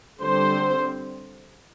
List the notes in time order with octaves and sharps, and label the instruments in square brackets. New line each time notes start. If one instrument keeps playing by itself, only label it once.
[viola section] D3 G3 C4 C5